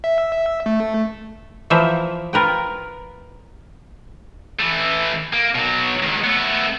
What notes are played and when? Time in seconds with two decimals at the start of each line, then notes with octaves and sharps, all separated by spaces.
0.04 E5
0.66 A3
1.70 E3 F3 A#4 C5 E5
2.33 F4 A#4 B4 G5
4.59 E3 A3
5.33 A#3
5.55 B2 F#3
6.03 C#2 D#3
6.24 A3 B3